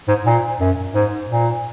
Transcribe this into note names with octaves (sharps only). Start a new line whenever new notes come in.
G#2
A#2
F#2
G#2
A#2